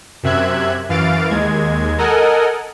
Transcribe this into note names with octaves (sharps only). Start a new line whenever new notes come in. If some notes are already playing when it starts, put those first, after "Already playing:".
F#2 C3 E5 F#6 G#6
F#2 E3 F5 A6 D7
D#2 G#3 G#6
A4 A#4 D#5 F#5 G#5